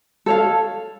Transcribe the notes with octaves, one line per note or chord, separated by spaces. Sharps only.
A4 C#5 F5